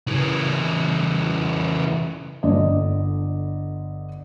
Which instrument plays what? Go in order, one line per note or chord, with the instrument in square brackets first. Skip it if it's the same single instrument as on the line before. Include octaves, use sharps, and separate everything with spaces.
[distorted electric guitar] C#3 E3
[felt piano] G1 D3 D5 D#5